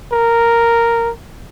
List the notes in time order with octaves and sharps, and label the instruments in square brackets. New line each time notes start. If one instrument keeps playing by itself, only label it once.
[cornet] A#4